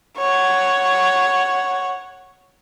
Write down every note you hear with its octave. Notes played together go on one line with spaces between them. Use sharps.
C#5 F#5